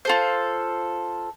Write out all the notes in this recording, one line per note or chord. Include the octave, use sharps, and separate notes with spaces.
F4 A4 C5